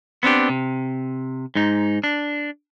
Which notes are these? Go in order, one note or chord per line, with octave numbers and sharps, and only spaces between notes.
B3 C4 D4 G4
C3
G#2 D#4
D4